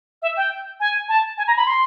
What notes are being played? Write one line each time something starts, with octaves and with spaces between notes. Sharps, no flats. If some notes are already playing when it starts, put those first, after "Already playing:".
E5
G5
G#5
A5
G#5
A#5
B5
C6